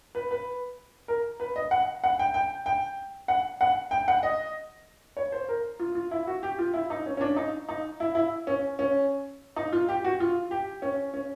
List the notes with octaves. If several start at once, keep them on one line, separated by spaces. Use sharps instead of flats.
B4
B4
A#4
B4
D#5
F#5
F#5
G5
G5
G5
F#5
F#5
G5
F#5
D#5
C#5
C5
A#4
F4
F4
E4
F#4
G4
F4
E4
D#4
C#4
C#4
D4
D#4
D#4
E4
E4
C#4
C#4
D#4
F4
G4
F#4
F4
G4
C#4
C#4